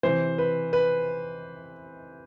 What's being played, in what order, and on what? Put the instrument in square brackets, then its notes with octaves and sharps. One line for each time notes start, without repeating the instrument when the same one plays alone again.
[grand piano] C3 E3 C5
B4
B4